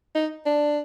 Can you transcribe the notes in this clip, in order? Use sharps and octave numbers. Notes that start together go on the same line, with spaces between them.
D#4
D4